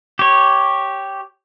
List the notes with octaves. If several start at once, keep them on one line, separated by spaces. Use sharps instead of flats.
G4 C#5